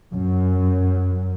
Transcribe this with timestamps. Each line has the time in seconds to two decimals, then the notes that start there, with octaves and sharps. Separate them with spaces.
0.13 F#2